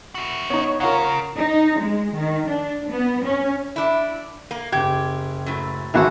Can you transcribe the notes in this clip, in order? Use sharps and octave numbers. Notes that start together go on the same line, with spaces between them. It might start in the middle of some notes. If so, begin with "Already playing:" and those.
E4 F#4
B3 D#4 C#5
C#3 F4 A#4 F5 F#5 A#5
D#4
G#3
D#3
D4
B3
C#4
D4 E4
A#3
F#1 G4 G#6
F#2 A2
G#1 E3 A#3 F#4 A4